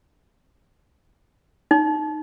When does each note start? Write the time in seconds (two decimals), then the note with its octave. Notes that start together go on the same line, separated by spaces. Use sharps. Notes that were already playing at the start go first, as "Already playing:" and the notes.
1.71 D#4